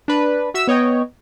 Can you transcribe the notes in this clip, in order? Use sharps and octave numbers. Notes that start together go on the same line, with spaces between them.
D4 B4
F#4 E5 E6
B3 C#5 D#5 G5